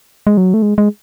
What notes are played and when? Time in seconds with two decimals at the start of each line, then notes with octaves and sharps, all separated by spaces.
0.27 G#3
0.37 F#3
0.54 A3
0.62 G#3
0.78 G#3